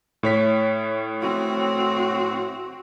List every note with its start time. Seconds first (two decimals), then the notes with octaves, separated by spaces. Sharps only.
0.23 A2 C#5 B6
1.22 C4 F#4